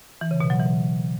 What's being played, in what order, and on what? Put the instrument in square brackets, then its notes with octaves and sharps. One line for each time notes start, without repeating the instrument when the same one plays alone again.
[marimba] E3
C#3
B2
F#3
E3